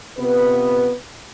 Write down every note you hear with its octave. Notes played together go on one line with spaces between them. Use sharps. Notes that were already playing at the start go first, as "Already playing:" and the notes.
C3 B3 F4 B4